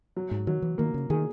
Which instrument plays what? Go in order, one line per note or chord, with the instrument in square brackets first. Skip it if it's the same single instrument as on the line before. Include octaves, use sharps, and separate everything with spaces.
[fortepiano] F#3
[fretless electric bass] G#2
[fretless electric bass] D#3 [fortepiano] F#3
[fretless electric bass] E3
[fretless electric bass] D#3 [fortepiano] A#3
[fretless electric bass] C#3
[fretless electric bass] D#3 [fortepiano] G#4